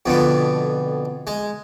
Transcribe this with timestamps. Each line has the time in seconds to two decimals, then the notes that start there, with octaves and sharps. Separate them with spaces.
0.06 F2 B2 D3 B3
1.27 G#3